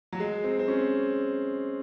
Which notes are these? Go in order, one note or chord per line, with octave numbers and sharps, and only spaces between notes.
F#3
G#3
C4
C4
C#4